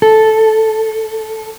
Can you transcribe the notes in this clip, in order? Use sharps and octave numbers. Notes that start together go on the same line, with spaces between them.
A4